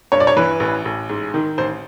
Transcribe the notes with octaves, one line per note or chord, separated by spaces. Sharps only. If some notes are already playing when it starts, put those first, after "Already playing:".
G2 C#5
D5
C#5
E3 B4
A1
A1
G#2
D#3
A1 C5